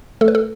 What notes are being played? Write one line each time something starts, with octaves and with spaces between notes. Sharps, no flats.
A3 A4
B4
A4